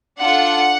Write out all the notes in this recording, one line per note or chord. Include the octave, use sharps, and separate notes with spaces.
D4 F4 A4 F#5